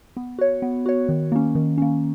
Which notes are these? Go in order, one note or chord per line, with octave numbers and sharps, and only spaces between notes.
B3
F#4 C#5
B3
F#4 C#5
D#3
A#3 C#4
D#3
A#3 C#4